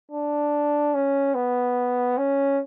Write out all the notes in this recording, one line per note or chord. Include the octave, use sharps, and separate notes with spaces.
D4
C#4
B3
C#4